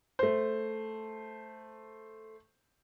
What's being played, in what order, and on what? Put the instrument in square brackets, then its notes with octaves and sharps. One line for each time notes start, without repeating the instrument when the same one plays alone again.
[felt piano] A3 C5